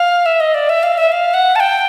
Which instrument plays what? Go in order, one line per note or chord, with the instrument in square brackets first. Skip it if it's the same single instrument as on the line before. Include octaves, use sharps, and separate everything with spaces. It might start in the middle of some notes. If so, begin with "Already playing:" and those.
Already playing: [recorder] F5
E5
D#5
D5
E5
F5
E5
F5
F#5
A5
G5